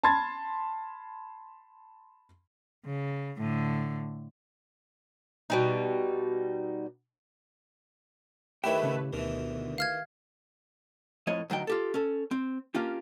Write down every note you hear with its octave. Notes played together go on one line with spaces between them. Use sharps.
A5 B5 C6 G#6 A6
C#3
A2 D3
B2 G3 D#4
D#3 A3 E4 G4 B4 C#5 E5 G5
A2 C#3 C#4
D2 B2 D#3 E3
F5 F6 G#6
F2 A2 C#5 D#5
D2 F#3 D#4 G5
F4 G4 A4
C#4 A4
C4
A#3 C#4 D4 F4 G4